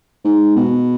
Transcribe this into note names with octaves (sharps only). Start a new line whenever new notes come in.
G#2
B2